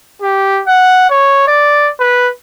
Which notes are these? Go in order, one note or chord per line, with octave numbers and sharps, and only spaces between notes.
G4
F#5
C#5
D5
B4